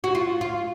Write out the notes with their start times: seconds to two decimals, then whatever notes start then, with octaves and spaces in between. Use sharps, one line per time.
0.04 F#4
0.15 F4
0.41 F4